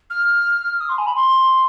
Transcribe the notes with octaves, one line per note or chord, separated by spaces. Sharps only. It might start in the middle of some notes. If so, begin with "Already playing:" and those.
F6
D#6
C6
G#5
B5
C6